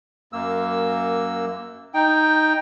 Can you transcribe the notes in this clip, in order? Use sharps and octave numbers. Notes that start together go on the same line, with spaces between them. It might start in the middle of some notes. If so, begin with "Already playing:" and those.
F#2 A#3 E6
D#4 G5